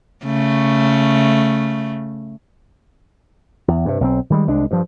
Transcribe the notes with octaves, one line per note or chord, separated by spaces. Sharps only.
C#3 A3
E2
G2 C3
B1 D#3 C4
D#3 G3 G#3
C2 G#3 D4
G2 F3